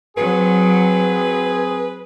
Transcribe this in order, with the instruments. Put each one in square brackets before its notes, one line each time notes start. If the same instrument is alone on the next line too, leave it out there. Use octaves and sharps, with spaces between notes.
[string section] F#3 [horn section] C4 G#4 [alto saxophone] B4